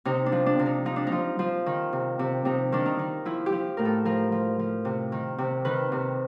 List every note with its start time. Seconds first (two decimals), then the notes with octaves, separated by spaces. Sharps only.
0.05 C3 D#4
0.26 D4
0.32 F3
0.46 D4
0.59 C3
0.66 D#4
0.85 F3 D#4
0.96 D4
1.07 D#4
1.12 F3
1.39 F3
1.66 D#3
1.93 C3
2.19 C3
2.45 C3 D#4
2.72 D#3 D4
2.86 D#4
2.99 D#3
3.25 F3 E4
3.46 G4
3.52 F3
3.77 A2 A#4
3.85 A4
4.05 F3 A#4
4.32 F3
4.59 F3
4.85 C3
5.12 D#3
5.38 C3
5.65 D#3 B4
5.92 C3